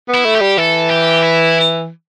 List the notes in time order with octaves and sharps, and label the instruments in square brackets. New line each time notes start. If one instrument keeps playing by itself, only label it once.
[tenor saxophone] B3
[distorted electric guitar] E4
[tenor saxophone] A3
[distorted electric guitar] G4
[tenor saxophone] G3
[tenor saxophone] E3 [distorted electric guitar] A4
[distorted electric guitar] G4
E4